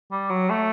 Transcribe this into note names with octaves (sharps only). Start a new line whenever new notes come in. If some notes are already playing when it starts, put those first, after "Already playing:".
G3
F#3
A3